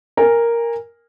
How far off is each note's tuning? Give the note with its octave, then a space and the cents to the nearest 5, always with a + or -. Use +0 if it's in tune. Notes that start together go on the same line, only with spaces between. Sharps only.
A#4 +0 G#5 -25